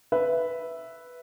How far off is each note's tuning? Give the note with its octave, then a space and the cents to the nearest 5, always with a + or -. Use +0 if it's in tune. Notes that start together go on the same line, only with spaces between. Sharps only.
B4 +0 E5 +0